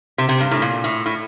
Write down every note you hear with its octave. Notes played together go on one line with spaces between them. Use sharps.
C3
C3
G2
A2
A#2
A2
A2